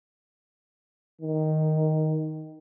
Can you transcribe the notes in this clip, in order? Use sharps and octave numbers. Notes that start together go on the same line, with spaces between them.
D#3